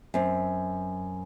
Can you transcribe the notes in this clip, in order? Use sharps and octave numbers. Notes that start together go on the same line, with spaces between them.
F#2 C4